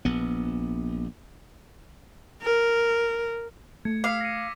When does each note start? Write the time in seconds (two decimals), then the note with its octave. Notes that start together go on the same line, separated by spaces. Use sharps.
0.05 A#1 B3
2.42 A#4
3.85 A3 G#6 C#7
4.04 F5 D6 E6 B6
4.21 A#6 C#7 D#7